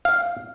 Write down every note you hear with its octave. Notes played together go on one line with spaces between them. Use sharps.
F5